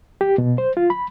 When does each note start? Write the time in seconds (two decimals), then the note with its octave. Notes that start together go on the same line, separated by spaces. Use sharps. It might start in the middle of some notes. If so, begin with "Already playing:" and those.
0.21 G4
0.38 B2
0.58 C5
0.77 F4
0.90 B5